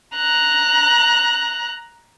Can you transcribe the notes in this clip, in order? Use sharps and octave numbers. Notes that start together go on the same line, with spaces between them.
A#5 F#6